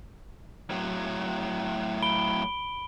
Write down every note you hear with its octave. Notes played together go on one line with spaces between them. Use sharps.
A2 F#3
B5 D7 G7